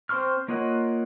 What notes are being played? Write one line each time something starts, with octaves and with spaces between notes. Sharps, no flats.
C4 C5 C6 C#6 F6
A#3 F4 C#5 D#5 F#5